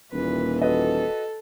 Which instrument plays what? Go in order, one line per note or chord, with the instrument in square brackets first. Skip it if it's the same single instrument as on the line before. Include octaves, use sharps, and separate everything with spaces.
[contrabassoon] D#1 [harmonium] A#2 E3 [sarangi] B4
[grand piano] F#4 B4 D#5 [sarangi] A4